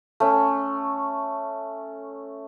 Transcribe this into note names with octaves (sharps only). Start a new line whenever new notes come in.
A3 C#4